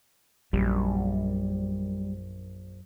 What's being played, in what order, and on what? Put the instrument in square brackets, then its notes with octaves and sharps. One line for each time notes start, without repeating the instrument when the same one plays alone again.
[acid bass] A#1 [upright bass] F#2 [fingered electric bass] G3